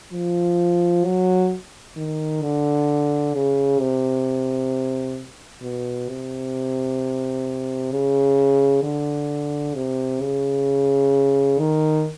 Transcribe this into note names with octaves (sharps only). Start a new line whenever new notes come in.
F3
F#3
D#3
D3
C#3
C3
B2
C3
C#3
D3
C3
C#3
D#3